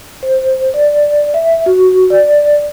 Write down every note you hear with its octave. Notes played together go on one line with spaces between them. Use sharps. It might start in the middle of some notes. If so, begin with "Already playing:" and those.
C5
D5
E5
F#4
D5